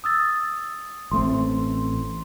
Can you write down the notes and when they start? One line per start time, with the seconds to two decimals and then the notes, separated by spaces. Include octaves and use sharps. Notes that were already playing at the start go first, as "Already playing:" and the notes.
0.04 D#6 E6 A6
1.11 A1 A3 C4 C6